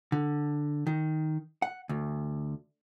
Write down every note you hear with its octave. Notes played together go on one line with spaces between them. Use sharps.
D3
D#3
F#5
D2